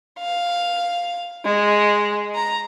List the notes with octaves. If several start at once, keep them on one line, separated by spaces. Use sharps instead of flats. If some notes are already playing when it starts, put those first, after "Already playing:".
F5
G#3
A#5